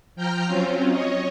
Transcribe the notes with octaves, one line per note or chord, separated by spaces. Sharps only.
F3 G5 A#5 F6 G6
F#3 C4 C#4 F4
C#5 D#5